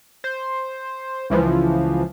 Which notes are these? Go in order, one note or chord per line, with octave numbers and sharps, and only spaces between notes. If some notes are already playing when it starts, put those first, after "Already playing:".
C5
C#2 E3 F3